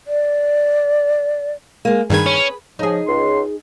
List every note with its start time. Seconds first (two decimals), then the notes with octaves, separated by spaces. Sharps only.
0.07 D5
1.85 G#3 A#3
2.10 G2 D#3 G#4 B4 G#6
2.26 C#4
2.79 C#3 F3 D#4 G#4
3.07 C#2 C6